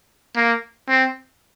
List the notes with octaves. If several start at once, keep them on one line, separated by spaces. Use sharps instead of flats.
A#3
C4